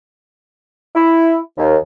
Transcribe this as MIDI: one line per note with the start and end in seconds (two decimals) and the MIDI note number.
0.95 1.37 64
1.58 1.76 39